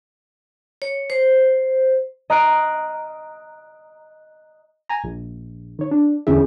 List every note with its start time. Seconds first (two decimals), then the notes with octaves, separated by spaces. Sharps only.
0.82 C#5
1.10 C5
2.30 D#5 A#5 F6 F#6 C7 D7
4.89 G#5 A#5
5.04 A#1
5.79 D#3 C#5
5.91 D4
6.27 E2 D3 C#4 E4 G#4 E5